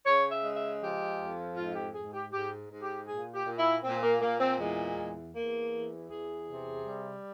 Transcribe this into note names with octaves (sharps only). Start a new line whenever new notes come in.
C#3 C#5
E5
G#3
E5
F3 G4
F2
G#2 F4
G4
G#2 G#4
G4
G#2 G4
G#2
G4
A#2 G#4
G4
A#2
E4
A#2 C4
A#3
A#2 A#3
C4
E2 G#3
E2
E2 A#3
E3
E2 G#4
C3
G3